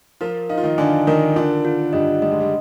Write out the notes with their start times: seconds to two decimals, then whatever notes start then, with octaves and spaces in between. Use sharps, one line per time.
0.21 F3 F4 A#4
0.49 D#4 F5
0.58 F4
0.63 D#3 D#4
0.78 D3 D4 G#5
1.07 D#3 D#4 A#4
1.36 D3 D4 F4
1.65 F4
1.93 G2 G3 D#5
2.22 G3 D#5
2.31 G#3
2.40 G3